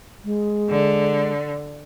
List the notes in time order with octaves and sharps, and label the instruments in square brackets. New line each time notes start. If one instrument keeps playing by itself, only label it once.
[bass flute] G#3
[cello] D3